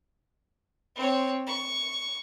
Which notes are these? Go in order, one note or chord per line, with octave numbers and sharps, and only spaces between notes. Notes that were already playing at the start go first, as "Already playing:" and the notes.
C4 C#5
C#6